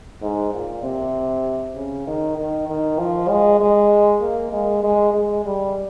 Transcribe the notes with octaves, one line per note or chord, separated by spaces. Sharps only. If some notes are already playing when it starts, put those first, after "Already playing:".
G#2
A#2
C3
C#3
D#3
D#3
D#3
F3
G#3
G#3
A#3
G#3
G#3
G#3
G3